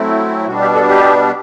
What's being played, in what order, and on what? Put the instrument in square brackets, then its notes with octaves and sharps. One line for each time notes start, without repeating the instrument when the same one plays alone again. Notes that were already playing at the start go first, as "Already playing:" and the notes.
Already playing: [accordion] F#3 A3 C4 E4
B2 G3 D4 F#4
G4
A4
G4